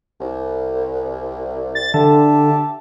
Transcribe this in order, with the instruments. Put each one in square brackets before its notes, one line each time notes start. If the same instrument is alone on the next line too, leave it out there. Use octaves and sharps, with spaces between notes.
[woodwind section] C2
[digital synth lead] A6
[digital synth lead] D3 [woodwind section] G4 E5 A5